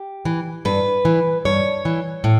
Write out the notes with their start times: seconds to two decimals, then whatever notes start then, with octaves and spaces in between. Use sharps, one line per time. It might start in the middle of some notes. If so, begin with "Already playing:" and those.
Already playing: G4
0.25 E3
0.65 G2 B4
1.05 E3
1.45 G2 C#5
1.85 E3
2.24 A2